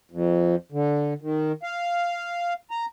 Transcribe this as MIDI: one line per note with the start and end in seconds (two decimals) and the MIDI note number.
0.11 0.55 41
0.72 1.14 50
1.22 1.52 51
1.63 2.54 77
2.71 2.86 82